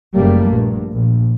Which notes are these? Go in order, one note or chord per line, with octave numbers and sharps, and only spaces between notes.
F#1 G3 A3 A#3
A#1 G2
A#1